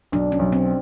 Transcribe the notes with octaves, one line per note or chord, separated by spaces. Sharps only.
B1 D4
C#4
B1
C4